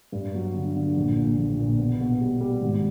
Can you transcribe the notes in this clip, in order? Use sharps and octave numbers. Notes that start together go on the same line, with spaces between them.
G2
F#3
D3
D3
A#1
A#2
A#1
A#2
B2
B2
G3
G3
G#1